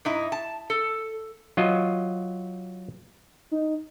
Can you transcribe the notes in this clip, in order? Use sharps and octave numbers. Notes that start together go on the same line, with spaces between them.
G#2 D#4 E4
A5
A4
F#3 F4 D#5
D#4